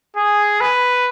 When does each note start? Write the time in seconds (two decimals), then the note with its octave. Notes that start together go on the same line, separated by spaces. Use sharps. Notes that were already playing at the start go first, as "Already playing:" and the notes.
0.17 G#4
0.61 B4